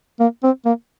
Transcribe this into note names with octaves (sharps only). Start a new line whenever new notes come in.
A#3
C4
A#3